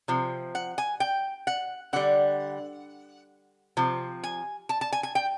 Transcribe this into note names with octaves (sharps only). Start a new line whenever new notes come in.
C3 F3
F#5
G#5
G5
F#5
D3 G3 F#5
C3 F3
G#5
A5
A5
G#5
G#5
G5